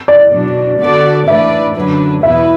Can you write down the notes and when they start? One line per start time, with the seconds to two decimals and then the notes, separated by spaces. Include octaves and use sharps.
0.08 D5
0.32 B2 F#3 D4
0.80 D3 B3 F#4 A4 D5
1.27 A2 E3 D4 B4 D5 E5
1.75 F#2 D3 F#3 D4 B4
2.23 E2 B2 B3 E4 B4 E5